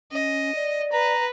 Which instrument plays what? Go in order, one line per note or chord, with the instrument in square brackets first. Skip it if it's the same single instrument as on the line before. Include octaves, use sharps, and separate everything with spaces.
[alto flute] C#4 [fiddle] D#5
[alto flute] D5
[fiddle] B4 [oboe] A#5